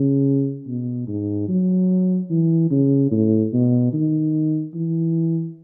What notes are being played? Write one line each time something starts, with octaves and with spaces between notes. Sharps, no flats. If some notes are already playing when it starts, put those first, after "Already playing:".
Already playing: C#3
B2
G#2
F#3
E3
C#3
A2
B2
D#3
E3